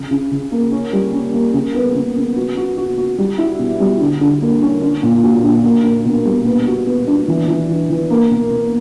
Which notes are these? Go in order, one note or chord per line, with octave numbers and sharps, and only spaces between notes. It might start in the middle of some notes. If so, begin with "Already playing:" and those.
Already playing: C#3
C#3
C#3
A#3
C#4
G3
C#4
A#3
C#3
B3
C#3
C#3
F#4
F#4
F#4
F#4
G3
E4
B2
G3
D3
D3
A#3
C#4
D4
A#2
F#4
D4
A#3
A#3
B2
G3
B3
F#4
B3
D4
E3
E3
E3
E3
A#3
B2
B2